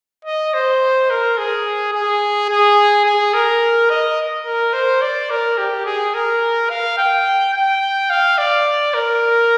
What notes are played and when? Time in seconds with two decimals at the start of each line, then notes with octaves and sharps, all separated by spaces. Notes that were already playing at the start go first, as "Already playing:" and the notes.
0.25 D#5
0.54 C5
1.10 A#4
1.38 G#4
1.93 G#4
2.49 G#4
3.05 G#4
3.34 A#4
3.90 D#5
4.46 A#4
4.73 C5
5.01 D5
5.30 A#4
5.58 G4
5.85 G#4
6.14 A#4
6.70 F5
6.98 G5
7.53 G5
8.10 F5
8.38 D5
8.94 A#4